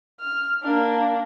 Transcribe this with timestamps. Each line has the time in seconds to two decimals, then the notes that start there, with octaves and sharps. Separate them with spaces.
0.20 F6
0.63 A#3 D4